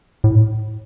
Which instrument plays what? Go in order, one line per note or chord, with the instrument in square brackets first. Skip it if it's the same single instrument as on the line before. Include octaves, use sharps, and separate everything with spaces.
[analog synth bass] A2